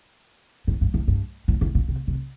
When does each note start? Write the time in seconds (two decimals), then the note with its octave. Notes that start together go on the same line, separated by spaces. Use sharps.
0.67 A2
0.81 G2
0.94 A2
1.08 G2
1.48 A2
1.61 A2
1.75 A#2
1.88 C3
2.07 C3